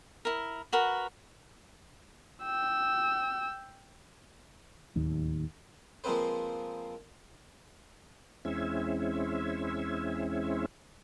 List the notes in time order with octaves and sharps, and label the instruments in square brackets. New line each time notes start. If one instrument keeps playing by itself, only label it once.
[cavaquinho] E4 A#4
F#4 A#4 B4
[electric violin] G5 E6
[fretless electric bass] D1 D#2
[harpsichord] F3 G#3 A#3 C4 B4 C5
[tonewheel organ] E2 G#3 C4 C#4 E4 E5